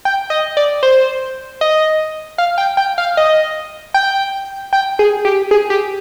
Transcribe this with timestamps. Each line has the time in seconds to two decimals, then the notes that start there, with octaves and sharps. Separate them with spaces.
0.05 G5
0.30 D#5
0.57 D5
0.83 C5
1.61 D#5
2.38 F5
2.58 G5
2.77 G5
2.98 F5
3.17 D#5
3.94 G5
4.73 G5
4.99 G#4
5.25 G4
5.51 G#4
5.70 G4